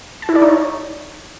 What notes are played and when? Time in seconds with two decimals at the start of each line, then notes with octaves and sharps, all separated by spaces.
0.22 A5
0.29 E4
0.35 D5
0.42 D#4
0.48 C#5